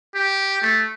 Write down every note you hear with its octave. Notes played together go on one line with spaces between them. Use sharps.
G4
A3